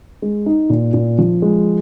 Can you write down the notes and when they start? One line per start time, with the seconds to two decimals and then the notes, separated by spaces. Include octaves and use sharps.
0.22 G#3
0.46 D#4
0.70 A#2
0.94 A#2
1.18 F3
1.42 G#3